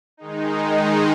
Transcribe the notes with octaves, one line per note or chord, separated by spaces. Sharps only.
D#3 G#3 D#4